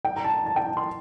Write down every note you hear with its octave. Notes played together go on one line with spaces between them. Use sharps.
G5
A#5
A5
A5
G5
A5
C6